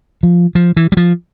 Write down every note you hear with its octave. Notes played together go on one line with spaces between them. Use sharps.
F3
F3
E3
G3
F3